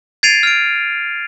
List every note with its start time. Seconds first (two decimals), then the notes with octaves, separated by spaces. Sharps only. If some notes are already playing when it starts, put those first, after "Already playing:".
0.23 G#6 A6 C7 D7 D#7 F7
0.43 F6 D7